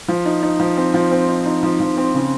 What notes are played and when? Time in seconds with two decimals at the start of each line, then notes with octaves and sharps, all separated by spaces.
0.08 F3
0.26 D#4
0.43 D#4
0.60 F3
0.77 C4
0.94 F3
1.11 C4
1.28 D#4
1.46 D#4
1.63 F3
1.80 F3
1.97 C4
2.14 C#3